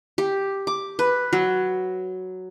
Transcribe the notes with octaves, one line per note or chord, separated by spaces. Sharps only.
G4
D6
B4
F#3